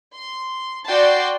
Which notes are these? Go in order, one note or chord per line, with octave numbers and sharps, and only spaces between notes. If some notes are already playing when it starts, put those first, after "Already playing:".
C6
F#4 D5 G5 A5 C6